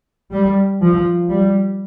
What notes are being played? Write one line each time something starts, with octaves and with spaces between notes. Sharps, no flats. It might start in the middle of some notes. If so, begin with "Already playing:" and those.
G3
F3
G3